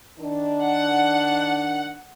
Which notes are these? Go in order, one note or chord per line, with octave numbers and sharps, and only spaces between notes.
D#3 D4
F#5